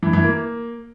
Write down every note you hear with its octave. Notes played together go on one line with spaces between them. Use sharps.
E3
E3
A#3